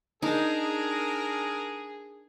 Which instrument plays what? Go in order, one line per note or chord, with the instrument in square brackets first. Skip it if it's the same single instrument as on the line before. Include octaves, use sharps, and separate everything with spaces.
[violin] D4 A#4 [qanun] D#4 [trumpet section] G#4